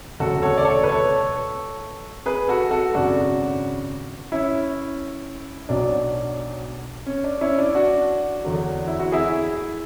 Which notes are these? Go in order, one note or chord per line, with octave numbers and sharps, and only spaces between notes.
E1 D2 C#3 F#3 F#4 A4
A4 C#5
D5
A4 C#5
B4
A4 C#5
G#4 B4
F#4 A4
F#4 A4
G#1 F#2 C#3 D4 F#4
C#4 E4
B1 B2 F#3 D4
C#4
D4
C#4 E4
D4
D4 F#4
E2 D3 F#3
E4
F#4
E4 G#4